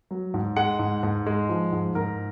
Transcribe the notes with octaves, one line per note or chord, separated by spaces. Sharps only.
F#3
G#2
G#3 F#5
G#2
G#2
G#3
F3
G#2
G#2 A#4